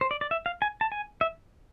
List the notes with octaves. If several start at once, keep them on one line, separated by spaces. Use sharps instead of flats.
C5
D5
D5
E5
F5
G#5
A5
G#5
E5